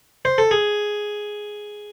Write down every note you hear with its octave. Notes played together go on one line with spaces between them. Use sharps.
C5
A4
G#4